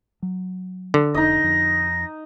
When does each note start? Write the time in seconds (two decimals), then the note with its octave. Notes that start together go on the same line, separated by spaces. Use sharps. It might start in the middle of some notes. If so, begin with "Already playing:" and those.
0.22 F#3
0.94 D3
1.15 F1 D#4 D#5 A#6
1.44 F2